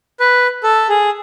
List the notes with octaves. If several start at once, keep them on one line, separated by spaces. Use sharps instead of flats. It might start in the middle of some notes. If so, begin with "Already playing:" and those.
B4
A4
G#4